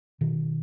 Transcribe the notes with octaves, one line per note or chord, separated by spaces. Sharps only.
B2 D#3